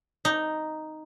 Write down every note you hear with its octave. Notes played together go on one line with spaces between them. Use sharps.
D#4